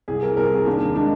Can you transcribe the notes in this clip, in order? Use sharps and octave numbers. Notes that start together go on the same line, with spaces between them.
C2 G#4
A#4
C2 A#4
G#4
D#2 D4
G#3 D4